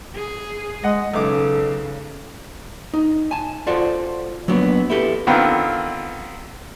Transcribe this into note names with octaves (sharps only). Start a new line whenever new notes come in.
G#4
G#3 D#5 F#5
B1 C#3 A4 D6
D#4
G#5 A5
F4 F#4 A4 C5 D5
F#3 A#3 B3 D4
E4 G4 A4 B4
D3 D#3 B3 C4 F4